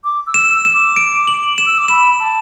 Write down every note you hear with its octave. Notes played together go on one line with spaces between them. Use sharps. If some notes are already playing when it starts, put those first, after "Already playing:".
D6
E6
E7
E6
E7
D6
D7
F#7
E7
E6
D6
B5 E7
A5